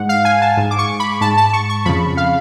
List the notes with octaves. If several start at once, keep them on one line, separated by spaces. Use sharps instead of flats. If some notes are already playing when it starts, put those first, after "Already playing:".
Already playing: G#2 F#5
F5
G#5
A5
G#2
D6
C#6
B5
G#2 A5
A5
C#6
C#6
F2 C#3 B5
F5